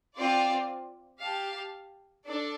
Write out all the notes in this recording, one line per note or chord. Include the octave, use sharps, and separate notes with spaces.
C4 F4 D5
G4 F5 A5
D4 A4 D5